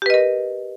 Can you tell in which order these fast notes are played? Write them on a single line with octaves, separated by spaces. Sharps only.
G4 B4 D#5 A#4